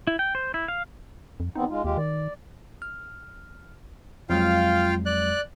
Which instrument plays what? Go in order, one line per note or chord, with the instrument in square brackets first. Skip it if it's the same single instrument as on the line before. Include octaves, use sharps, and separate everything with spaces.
[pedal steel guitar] E4
G5
C5
E4
F5
[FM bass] F2
[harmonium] E2 B3 C4 [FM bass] D#4
[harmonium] G#3 F4
[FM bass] D#2 [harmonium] G#3 F4 G4
[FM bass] D#3 [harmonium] D5
[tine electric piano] F6
[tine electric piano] F2 F#3 G#3 [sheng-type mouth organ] F4 F5 G5
[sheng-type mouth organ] D5 F#6